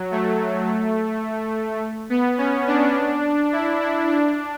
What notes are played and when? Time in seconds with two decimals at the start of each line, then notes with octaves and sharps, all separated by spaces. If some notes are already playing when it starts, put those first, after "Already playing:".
Already playing: F#3
0.11 A3
2.10 B3
2.38 C#4
2.67 D4
3.53 E4
3.80 E4
4.09 D4